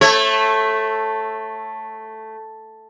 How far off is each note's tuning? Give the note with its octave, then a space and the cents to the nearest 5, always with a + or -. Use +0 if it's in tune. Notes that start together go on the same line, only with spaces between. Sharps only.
A3 +0 A4 +0 C#5 -30